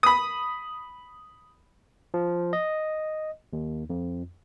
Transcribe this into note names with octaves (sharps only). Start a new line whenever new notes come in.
B5 D#6
F3
D#5
D#2
F2